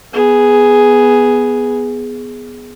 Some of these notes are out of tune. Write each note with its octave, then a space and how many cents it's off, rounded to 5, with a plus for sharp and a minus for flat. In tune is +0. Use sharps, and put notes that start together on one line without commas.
B3 +0 G#4 +0